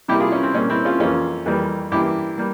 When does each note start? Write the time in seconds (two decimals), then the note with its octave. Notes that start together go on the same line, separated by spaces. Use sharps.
0.08 C3 G3 A#3 E4 G4
0.20 F4 G#4
0.32 C#4
0.43 C4
0.54 A#2 G3 A#3 C#4
0.70 C4 E4
0.85 C#4 F4
1.00 F2 E3 A#3 C#4 F4
1.46 F2 E3 G3 A#3
1.92 G2 E3 A#3 E4 G4
2.38 G3 A#3